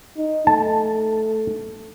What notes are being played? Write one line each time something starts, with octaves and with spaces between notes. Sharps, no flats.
D#4
A3 A5